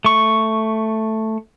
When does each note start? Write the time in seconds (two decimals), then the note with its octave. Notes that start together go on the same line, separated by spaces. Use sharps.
0.05 A3 C#6